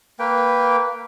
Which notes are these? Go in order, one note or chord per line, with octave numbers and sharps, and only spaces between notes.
A#3 B4 G5